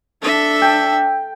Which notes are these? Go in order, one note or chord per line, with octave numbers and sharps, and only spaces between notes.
D4 A4 E5
G5